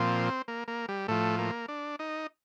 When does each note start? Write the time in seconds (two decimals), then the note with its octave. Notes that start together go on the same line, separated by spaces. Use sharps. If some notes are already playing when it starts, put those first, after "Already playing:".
Already playing: A#2 F3 C4
0.48 A#3
0.68 A#3
0.89 G3
1.08 A2 F3 A3
1.39 A#3
1.68 D4
1.99 D#4